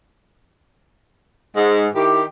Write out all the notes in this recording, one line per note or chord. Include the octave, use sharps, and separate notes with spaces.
G#2
D#3 E4 G4